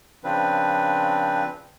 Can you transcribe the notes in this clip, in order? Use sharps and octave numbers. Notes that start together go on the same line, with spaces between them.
C#3 F3 C4 D4 B4